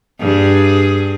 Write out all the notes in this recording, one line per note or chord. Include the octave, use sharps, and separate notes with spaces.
G2 G#4